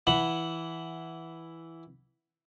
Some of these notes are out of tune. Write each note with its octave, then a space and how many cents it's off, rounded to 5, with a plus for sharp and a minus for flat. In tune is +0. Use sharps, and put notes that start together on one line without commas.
E3 +0 F#5 +0 B5 +0